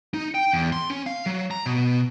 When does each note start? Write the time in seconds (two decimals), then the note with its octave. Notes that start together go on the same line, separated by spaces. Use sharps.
0.14 D#4
0.35 G5
0.53 E2
0.73 C6
0.90 C#4
1.06 F5
1.26 F#3
1.51 A#5
1.66 B2